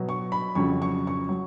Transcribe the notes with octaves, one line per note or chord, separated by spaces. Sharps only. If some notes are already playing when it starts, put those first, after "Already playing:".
Already playing: B2 F#3
C#6
B5
F2 C#3 F#3 C#6
C#6
C#6
F#3